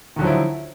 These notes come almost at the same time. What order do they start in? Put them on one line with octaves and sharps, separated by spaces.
D#3 D3 F#3 F3 E4